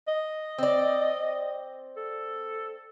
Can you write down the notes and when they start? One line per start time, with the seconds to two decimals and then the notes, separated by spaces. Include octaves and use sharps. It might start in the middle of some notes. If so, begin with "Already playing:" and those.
0.08 D#5
0.58 C4 D5
1.97 A4